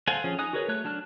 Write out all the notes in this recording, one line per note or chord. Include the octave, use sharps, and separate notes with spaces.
A4 C5 F5 F#5 G#5
F3 C#4 G#4
D#4 G#5 D#6 F#6
F#4 G#4 A#4 B4 C#5
A3 C#5 F#6
F#3 D4 A5 F6 F#6